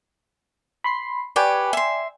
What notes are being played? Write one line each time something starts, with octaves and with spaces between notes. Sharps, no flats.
B5 C6 C7
G4 B4 D5 G5 G#5 C#6
E5 C6